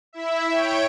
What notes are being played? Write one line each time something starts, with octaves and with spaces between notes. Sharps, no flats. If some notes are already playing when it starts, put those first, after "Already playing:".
E4 E5
C#5 G5 D7